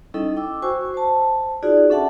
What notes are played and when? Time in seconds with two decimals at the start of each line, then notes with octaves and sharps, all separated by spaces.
0.14 G3 C#4 D#4 E4 A4 D#5
0.36 G5 D6 E6
0.62 F#4 C5 G#5 C#6 E6
0.94 C5 A5
1.63 D#4 F4 F#4 G#4 D5
1.90 C#4 D4 A4 E5 F#5 A5